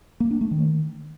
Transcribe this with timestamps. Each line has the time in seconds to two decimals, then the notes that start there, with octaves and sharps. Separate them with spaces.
0.20 A#3
0.31 D4
0.41 A3
0.51 D#3